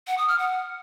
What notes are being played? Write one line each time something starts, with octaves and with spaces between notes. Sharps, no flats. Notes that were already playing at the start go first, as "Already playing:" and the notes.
F#5
D#6
F6
F#5